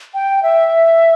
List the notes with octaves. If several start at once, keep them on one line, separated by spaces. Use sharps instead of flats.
G5
E5